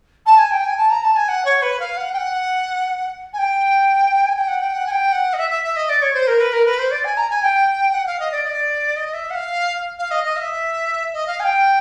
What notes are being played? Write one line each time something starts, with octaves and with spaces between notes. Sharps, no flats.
A5
G#5
G5
G#5
A5
A#5
A5
G#5
F#5
C#5
B4
F5
F#5
G5
F#5
G#5
G5
G#5
G5
F#5
G5
F#5
G#5
G5
F#5
D#5
E5
E5
E5
D#5
D5
C#5
C5
A#4
B4
A#4
B4
C5
D5
G#5
A#5
G#5
G5
F#5
F5
D#5
D5
D#5
D5
D#5
E5
F#5
F5
F5
D#5
D#5
F5
E5
D#5
F5
G#5
G5